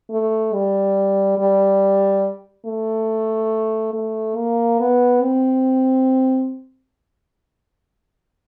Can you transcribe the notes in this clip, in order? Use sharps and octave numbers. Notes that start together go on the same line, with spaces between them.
A3
G3
G3
A3
A3
A#3
B3
C4